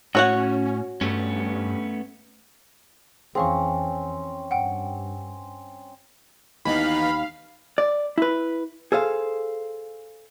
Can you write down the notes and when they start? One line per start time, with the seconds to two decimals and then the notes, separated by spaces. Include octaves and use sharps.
0.15 A2 C#4 F#4 C#5 F#5
1.01 G2 A3 B3 C#4
3.35 F2 E3 C4 C#4 G#4 F5 C#6
4.51 G2 F#5 G5
6.65 D#2 E3 B3 D#4 F5 B5
7.78 D5
8.18 E4 B4
8.92 G#4 A4 C5 F5